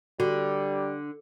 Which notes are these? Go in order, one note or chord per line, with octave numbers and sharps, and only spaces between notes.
D3 G3 F#4